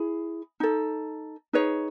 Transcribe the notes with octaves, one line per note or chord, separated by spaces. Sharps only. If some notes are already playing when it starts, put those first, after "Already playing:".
Already playing: E4 G#4
D#4 A4
D#4 G#4 B4 C#5